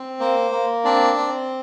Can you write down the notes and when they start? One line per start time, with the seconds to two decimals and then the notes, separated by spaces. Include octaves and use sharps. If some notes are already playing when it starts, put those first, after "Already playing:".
Already playing: C4
0.20 A#3 C5
0.52 A#3
0.85 C4 D4 D5
1.18 C4